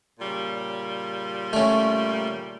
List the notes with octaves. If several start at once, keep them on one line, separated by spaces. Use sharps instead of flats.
A#2 C#3 G3
A3 C#4